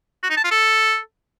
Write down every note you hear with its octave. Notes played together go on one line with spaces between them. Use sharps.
F#4
D#4
A5
F4
A4